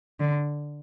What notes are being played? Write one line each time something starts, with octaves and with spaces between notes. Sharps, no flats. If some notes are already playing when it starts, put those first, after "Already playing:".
D3